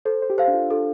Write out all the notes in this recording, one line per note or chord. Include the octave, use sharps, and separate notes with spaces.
A4 C5
C5
G4
A4 C5 F5
D4
F4
F4 A4